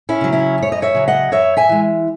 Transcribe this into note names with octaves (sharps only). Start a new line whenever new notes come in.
C#4 E4
C#3 F#3
C#4 E4
F#2 C#5
D#5
C#5 E5
C#3 F#3
D#5 F#5
F#2 C#5 E5
E5 G#5
E3 G#3